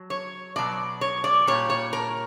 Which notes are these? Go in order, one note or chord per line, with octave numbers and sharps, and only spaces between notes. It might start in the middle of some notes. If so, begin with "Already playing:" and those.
Already playing: F#3
C#5
B2 F#3 D5
C#5
D5
A#2 G3 C#5
C#5
A#4